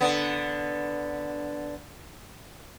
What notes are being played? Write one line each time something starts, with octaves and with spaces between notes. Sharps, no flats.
D3 B3